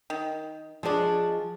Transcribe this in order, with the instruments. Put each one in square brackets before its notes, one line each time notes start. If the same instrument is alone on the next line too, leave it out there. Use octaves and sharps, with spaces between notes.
[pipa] D#3
[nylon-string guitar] F3 G#4 C#5 [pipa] G#3 D4